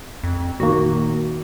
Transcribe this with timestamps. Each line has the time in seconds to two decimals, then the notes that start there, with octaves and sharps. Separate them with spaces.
0.23 F2
0.60 A#2 D#3 A#3 F#4